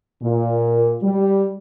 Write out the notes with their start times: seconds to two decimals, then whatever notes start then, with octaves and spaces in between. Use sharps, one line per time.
0.23 A#2
1.02 G3